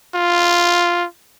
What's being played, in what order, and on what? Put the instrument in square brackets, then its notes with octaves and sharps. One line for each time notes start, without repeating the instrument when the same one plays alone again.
[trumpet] F4